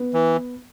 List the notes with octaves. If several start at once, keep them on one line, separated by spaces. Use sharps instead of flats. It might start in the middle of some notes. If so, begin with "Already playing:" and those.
Already playing: B3
E3